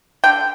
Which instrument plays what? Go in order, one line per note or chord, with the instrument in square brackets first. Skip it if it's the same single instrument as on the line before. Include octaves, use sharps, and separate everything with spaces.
[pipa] D3 G5